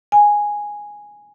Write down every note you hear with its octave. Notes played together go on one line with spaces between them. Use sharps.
G#5